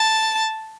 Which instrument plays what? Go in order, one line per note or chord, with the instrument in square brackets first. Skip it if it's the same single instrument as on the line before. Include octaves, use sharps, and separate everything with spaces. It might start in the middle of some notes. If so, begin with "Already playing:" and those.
Already playing: [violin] A5